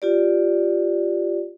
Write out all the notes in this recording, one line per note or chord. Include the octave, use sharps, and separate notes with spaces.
F4 G4 D5